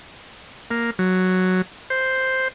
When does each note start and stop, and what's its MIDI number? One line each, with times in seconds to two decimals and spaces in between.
0.71 0.90 58
0.99 1.62 54
1.90 2.48 72